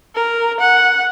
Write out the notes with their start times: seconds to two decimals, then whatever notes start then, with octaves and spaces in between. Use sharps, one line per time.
0.15 A#4
0.60 F#5